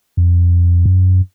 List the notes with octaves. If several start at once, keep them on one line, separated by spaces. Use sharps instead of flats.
F2
F#2